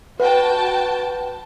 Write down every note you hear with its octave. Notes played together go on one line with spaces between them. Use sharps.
F#4 B4 G5 A5